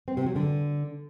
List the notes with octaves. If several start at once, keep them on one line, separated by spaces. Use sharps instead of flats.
C4
C3
F#3
D3